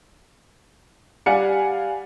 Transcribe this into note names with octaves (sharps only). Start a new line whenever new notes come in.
G3 D5 F5 F#5 G#5 C#7